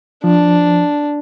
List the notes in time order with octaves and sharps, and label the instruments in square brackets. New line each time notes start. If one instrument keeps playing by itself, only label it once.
[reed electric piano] F3 [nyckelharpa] D4